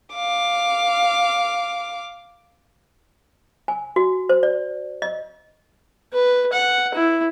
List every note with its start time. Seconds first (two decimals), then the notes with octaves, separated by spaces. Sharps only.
0.15 F5 D6
3.68 G#5
3.96 F#4
4.29 C5
4.43 D5
5.02 D#5
6.13 B4
6.53 F#5
6.95 E4